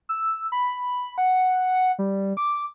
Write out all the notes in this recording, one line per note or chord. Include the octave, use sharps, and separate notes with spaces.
E6
B5
F#5
G3
D6